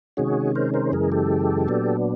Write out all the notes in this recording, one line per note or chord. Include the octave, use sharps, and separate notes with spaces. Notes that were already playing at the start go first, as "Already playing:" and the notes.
C3 D#3 G#3 C#4 F#4 G#4
A#4 C5
A#4 C5
F#2 C#3 E3 G#3 G#4 A#4
G4 A4
A#2 F#3 B3 D4